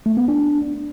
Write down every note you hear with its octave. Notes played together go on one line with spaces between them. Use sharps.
A3
B3
D4